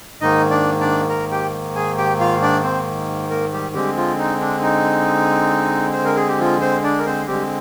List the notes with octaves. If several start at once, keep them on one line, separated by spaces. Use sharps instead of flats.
G#2 D#3 A#3 D#4 D#5
D4 D5
D4 D5
A#4 A#5
G4 G5
G#4 G#5
G4 G5
F4 F5
D4 D5
C4 C5
A#3 A#4
G3 G4
D3 G3 G#3 C4 G4
F3 F4
D#4
D4
D#4
C5
A#4
G#4
G4
F3 F4
C4 C5
D4 D5
A#4
C4 C5
D3 G3 G#3 C4 G4